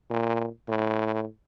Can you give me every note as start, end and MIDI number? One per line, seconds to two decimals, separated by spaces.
0.10 0.48 46
0.69 1.26 45